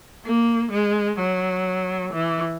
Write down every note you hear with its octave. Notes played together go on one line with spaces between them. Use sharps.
A#3
G#3
F#3
E3